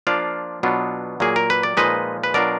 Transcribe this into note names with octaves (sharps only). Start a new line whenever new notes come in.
F3 A#3 D4 F4 D5 F5
B2 F#3 B3 D4 F4
A#2 F#3 A#3 G#4
A#4
B4
D5
A#2 F3 G#3 D#4 B4 D#5
B4
B2 F#3 D4 F4 A#4 D5